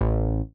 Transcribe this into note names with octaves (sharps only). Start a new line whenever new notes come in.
A1